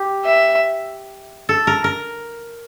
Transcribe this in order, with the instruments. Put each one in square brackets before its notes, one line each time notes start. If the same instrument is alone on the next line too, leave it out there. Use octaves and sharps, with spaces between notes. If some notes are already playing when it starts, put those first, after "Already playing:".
Already playing: [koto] G4
[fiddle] E5
[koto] A4
A#4
A#4